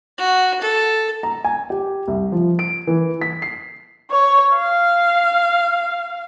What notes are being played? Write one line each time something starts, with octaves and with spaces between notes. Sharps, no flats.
F#4
A4
A#5
G#5
G4
C2
F3
D7
E3
B6
C7
C#5
F5